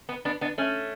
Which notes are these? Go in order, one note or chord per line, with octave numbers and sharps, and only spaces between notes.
B3
B3 D4
B3 D4
A3 C#4